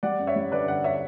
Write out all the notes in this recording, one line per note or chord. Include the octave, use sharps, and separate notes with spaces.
G3 D5 F#5
F#2
C#5 E5
G3
D3 B4 D5
G1 D5 F#5
C#5 E5